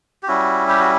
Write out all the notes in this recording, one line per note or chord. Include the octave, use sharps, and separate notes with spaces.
G4
G3 C#4 E4 F#4
G4
F#4